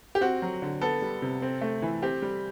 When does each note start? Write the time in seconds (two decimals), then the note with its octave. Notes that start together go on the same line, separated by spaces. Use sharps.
0.15 G4
0.21 C4 F#4
0.42 F#3
0.62 D3
0.82 B3 A4
1.02 G3
1.22 C3
1.42 C4
1.61 A3
1.82 E3
2.02 C4 G4
2.22 G3